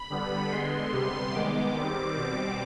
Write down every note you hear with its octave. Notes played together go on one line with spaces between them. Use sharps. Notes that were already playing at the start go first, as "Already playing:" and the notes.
Already playing: B5
D3 G3 B3
D3 G#3 B3 C6
C3 G3 B3
D#3 G#3 B3 D6
D#3 G3 C4
B2 G3 C4 D6